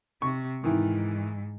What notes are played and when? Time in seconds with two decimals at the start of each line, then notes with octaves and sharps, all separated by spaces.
0.22 C3 C#6
0.64 G#2 D#3 E3